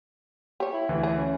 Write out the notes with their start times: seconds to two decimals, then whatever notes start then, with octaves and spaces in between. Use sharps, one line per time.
0.60 G4 C#5
0.74 E4
0.89 D2 E3
1.03 G#4
1.17 C#4